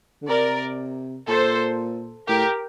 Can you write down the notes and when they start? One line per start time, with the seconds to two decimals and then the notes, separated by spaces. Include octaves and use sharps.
0.22 D3
0.28 C3 A#4 D5
1.28 A#2 A4 C5
2.28 A2 G4 A#4